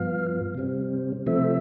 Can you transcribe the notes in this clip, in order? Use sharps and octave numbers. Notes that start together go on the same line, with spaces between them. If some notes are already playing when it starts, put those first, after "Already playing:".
Already playing: G2 F3 B3 F5
C3 G3 C4
C3 F3 A3 C4 E5